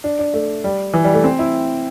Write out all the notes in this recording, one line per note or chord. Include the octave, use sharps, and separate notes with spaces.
D4
D4
A3
G3
E3
G3
A3
C4
E4